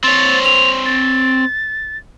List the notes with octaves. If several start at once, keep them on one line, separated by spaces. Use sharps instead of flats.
C4 C#5 A6
F7
A6